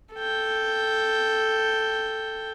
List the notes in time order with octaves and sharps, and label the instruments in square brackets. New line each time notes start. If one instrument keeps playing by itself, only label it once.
[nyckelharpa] A4 G5